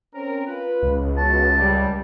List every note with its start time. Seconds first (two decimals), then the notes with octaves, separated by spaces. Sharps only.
0.14 C4 C#4 A#4
0.47 F4 B4
0.83 C#2
1.17 B2 F#4 A5
1.59 G3